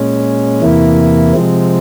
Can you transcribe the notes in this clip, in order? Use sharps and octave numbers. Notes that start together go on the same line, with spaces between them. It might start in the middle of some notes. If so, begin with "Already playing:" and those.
Already playing: A#2 G#3 C#4
E2 C3 E3 A#3 E4
C3 F3 G#3 C4